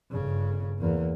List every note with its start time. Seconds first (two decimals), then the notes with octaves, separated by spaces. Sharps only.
0.11 G1 C#3
0.79 E2 A#3